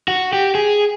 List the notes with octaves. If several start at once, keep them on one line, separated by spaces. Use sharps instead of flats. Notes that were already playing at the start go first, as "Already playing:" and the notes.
F#4
G4
G#4